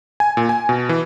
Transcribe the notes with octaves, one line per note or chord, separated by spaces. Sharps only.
G#5
A#2
G#5
B2
E3